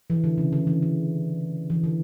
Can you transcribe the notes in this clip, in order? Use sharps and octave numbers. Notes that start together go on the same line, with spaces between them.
E3
D3
C#3
D3
E3
D3
E3
D3